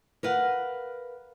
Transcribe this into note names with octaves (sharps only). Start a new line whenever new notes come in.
A#4 B4 F5 F#5